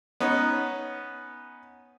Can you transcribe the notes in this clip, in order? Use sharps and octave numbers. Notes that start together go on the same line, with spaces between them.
B3 C#4 D#4